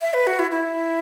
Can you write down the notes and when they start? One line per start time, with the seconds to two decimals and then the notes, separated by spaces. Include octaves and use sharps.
0.02 E5
0.14 B4
0.27 F#4
0.39 E4
0.51 E4